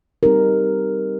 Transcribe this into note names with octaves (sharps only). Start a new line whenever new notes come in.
G3 C4 D#4 G4 A#4